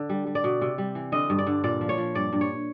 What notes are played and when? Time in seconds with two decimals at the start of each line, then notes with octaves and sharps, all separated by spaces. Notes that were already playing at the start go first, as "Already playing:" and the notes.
Already playing: D3
0.09 G3
0.27 G3
0.35 D5
0.44 B2
0.61 C3
0.78 G3
0.95 E3
1.12 D3 D#5
1.30 G2
1.38 D5
1.47 D3
1.64 A#2 D5
1.81 F3
1.89 C#5
1.98 F3
2.15 G2 D5
2.33 G2
2.41 C#5